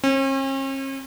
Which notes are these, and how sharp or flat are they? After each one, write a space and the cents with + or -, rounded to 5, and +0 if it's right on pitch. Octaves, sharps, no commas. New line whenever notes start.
C#4 -45